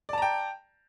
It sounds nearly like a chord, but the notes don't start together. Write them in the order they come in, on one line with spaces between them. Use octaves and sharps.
D5 A5 A#5 G5